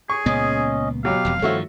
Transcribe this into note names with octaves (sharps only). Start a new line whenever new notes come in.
G#4 C#6
C#2 A#2 B3 C#4 D#5
B2 F#3 G4 F5
E1 F2
G2 D#3 F3 A3 C4 F#4 C#5 E5